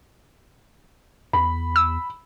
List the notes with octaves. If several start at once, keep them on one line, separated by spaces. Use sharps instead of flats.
E2 B5
E6